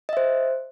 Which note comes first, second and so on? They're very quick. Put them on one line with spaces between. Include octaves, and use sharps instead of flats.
D#5 E5 C5